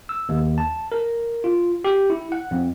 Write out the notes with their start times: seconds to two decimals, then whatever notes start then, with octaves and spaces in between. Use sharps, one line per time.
0.09 E6
0.29 D#2
0.58 A5
0.92 A#4
1.44 F4
1.84 G4
2.10 E4
2.32 F#5
2.51 F2